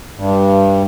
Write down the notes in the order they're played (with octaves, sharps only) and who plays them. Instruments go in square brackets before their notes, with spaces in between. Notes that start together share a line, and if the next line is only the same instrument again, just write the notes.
[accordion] G2